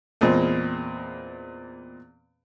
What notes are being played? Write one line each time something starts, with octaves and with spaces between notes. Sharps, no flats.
E2 A#2 G#3 C4